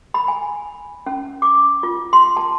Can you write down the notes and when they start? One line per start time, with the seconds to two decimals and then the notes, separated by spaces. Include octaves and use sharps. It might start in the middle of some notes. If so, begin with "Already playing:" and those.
0.14 B5
0.28 G#5
1.06 C#4
1.42 D6
1.83 F4
2.13 C6
2.37 A5